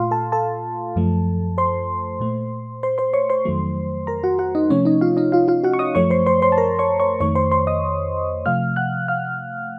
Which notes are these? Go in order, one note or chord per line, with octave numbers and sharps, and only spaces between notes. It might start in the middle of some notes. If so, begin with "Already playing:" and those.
Already playing: A#2 A3 F4 F5 C6
A4 A5
A4 A5
F#2 F3 A3
C5 C6
A#2 A3
C5 C6
C5 C6
C#5 C#6
C5 C6
F2 D#3 F#3 A3
A#4 A#5
F#4 F#5
F#4 F#5
D#4 D#5
C3 F3 A3 C#4 C#5
D#4 D#5
F4 F5
D#4 D#5
F4 F5
F4 F5
F#4 F#5
C#6
D#5 D#6
F#2 F3 A3 C#5 C#6
C5 C6
C5 C6
C5 C6
A5
A#4 A#5
C#5 C#6
C#5 C#6
F2 D#3 A3 C#5 C#6
C5 C6
C5 C6
D#5 D#6
C3 F3 A3 F5 F6
F#5 F#6
F5 F6